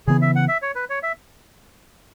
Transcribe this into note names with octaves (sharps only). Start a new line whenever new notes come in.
C#3 E3 B3 G#4
E5
F#5
E5
C#5
B4
C#5
E5